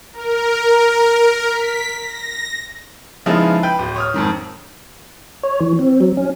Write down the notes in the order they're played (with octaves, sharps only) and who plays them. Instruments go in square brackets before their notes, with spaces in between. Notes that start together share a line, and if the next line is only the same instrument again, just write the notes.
[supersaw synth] A#4
B6
A#6
[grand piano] C#3 F3 G#3 B3 D#4 E4
B4 G5 G6
D1
C#5 D#6 F6
F2 G#2 D#3
[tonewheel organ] C#5
E3
C4
F#3
C#4